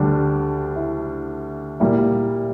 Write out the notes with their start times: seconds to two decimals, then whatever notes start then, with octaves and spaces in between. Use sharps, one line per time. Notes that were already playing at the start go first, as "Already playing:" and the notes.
Already playing: D2 D3 G3 D4
0.76 E4
1.80 A#2 G3 A#3 E4